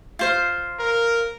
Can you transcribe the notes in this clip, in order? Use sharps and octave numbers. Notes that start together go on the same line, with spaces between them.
F4 C5 F5
A#4